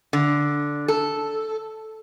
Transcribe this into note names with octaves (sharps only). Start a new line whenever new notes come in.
D3
A4